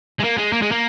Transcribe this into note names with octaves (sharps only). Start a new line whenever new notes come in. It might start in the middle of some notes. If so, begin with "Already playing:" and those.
G#3
A#3
G#3
A#3
G#3
A#3